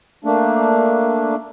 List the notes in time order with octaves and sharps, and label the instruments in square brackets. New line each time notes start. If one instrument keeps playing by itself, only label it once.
[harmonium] A3 A#3 D4